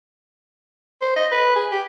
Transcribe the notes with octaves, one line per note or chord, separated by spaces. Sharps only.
C5
D#5
B4
G#4
G4